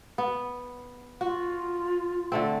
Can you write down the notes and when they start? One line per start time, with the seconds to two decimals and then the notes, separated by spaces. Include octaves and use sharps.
0.18 B3
1.21 F4 F#4
2.32 D3 A3 C4